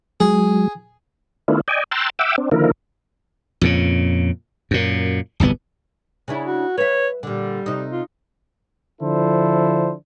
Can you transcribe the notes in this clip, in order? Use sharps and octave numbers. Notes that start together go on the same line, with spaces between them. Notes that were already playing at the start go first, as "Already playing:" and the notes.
F#3 G#3 G#4
D#3 A3 B3 D4 E4 F4
D5 D#5 G5 G#5
G5 A#5 C6 E6 F#6 A6
E5 F#5 G5 D6 E6
C4 D4
D3 D#3 F3 A#3 E4 A#4
F2 A#2 C#3
F#2 A#2
D1 G1 C2 B3
C#3 D4 E4
F#4
B4 C#5 E5
A#2 D3 G3
C3 D#4
F4
D3 F3 D4 E4 A4 C5